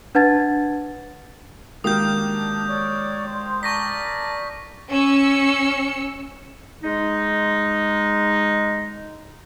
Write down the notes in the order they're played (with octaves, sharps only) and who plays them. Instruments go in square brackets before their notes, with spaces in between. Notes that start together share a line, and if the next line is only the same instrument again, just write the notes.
[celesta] D4 B4 F#5 A5 G#6 A6
[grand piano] D#3 A#3 G4 [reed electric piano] G#3 F#4 [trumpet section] D4 [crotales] D#6 G6
[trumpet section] C#5 D5
C5
[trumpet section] A#4 D5 A5 [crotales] C#6 A#6 B6
[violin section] C#4 E6 C#7
[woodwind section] G#3 D#4